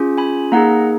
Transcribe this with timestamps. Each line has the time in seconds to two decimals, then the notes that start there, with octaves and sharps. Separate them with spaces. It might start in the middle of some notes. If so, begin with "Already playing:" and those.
Already playing: C#4 F4 G#4
0.18 G#5 B5
0.52 A#3 D#4 G#4 F#5 A#5